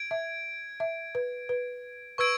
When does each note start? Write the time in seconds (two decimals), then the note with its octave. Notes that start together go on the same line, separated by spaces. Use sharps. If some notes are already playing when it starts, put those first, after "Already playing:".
Already playing: G#6 D7
0.11 E5
0.80 E5
1.15 B4
1.49 B4
2.18 B4 C#6 E6 G#6 D7